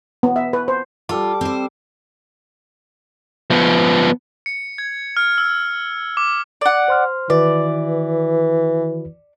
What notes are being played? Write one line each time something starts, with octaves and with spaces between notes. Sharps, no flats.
B3
E5
B4
C5
G3 F4 A4 D6
C4 C5
F3 B3
C#7
G#6
F6
E6
D6
D5 F#5
C5 C6 F6
D#3 E3 F#4 B4 D5